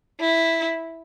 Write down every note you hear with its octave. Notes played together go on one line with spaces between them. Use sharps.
E4